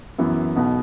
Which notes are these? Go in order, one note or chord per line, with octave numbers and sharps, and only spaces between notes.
F#2 E3 B3 E4
B1 B2 B3